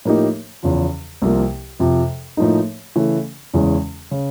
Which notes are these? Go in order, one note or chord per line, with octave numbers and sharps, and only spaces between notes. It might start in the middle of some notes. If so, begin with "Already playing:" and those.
A2 F3 A#3 D#4 G4
E2 C#3 F3
C2 C3 F3 A#3
F2 C3 F3
A2 F3 A#3 D#4
C#3 E3 A3
E2 C#3 E3 G#3 C#4
C#3